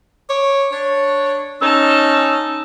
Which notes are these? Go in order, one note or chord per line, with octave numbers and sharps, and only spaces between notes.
C#5 D6
D4 C#5
C#4 D#4 A5 E6